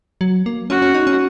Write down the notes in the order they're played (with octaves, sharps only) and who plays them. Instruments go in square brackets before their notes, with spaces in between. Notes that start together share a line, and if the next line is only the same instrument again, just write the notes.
[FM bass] F#3
A#3
[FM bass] C#4 [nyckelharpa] F#4
[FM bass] C#4
D#4
C#4